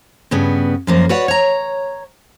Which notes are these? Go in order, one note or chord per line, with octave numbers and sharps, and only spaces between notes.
G2 C#3 B3
F#2 F3 A#3
F#4 B4 C#5 D5 F#5
C#5 A#5